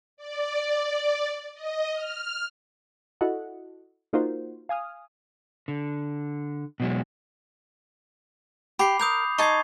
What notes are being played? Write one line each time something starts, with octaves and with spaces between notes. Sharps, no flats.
D5
D#5
F6
E4 F#4 A4 D#5 F#5
A#3 D#4 F4 F#4 A#4 C5
F5 G#5 D#6 F6
D3
B2 F#3 G#3
G4 B5 D6 C7
A#4 D#6 G6 F7
D#4 A5 C#6 G#6 C7